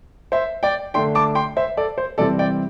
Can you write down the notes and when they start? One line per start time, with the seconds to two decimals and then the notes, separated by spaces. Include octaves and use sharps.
0.32 C5 E5
0.63 D5 G5
0.94 D3 A3 D4 G5 C6
1.15 A5 D6
1.35 G5 C6
1.57 C5 E5
1.77 A4 D5
1.98 C5
2.18 C3 E3 G3 C4 A4 D5
2.39 D5 G5